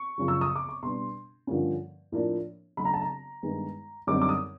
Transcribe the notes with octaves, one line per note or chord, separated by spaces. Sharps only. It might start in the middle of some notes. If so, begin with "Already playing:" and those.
Already playing: C#6
F#2 C#3 F3
E6
D#6
D6
C#6
B2 G3 B3 D4 C6
G2 D3 F3 A#3 C#4
A2 F3 A#3 D4
C#3 F#3 A3 D4 B5
A#5
A5
A#5
G2 D#3 G#3 B3 D#4
F#2 D3 G3 C4 D#4 D6
D6
D#6